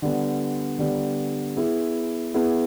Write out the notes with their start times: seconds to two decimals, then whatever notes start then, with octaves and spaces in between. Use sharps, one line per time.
0.02 D3 G3 B3
0.79 D3 G3 B3
1.56 B3 E4 G#4
2.34 B3 E4 G#4